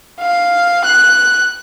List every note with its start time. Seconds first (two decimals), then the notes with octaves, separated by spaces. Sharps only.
0.21 F5
0.85 F#6